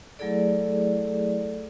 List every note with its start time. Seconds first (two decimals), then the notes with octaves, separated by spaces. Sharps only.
0.19 F#3 A3 E4 G#4 A4 D5